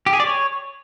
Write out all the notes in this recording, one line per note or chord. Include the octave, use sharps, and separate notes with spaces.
G4
G#4
D5
C#5